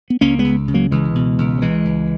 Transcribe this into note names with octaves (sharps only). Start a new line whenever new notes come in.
B3
C#2 A#3 C#4
G#3 B3
C#2
C#3
F#3 A#3
C#2 E3 G#3
B2
C#2
F#3
C#2 E3 G#3
C#2